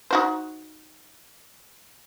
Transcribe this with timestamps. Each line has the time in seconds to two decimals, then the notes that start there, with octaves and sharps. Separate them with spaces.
0.11 D#4 F#4 C5